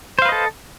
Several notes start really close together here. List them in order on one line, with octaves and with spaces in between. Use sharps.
C5 F5 B4 D#5 A4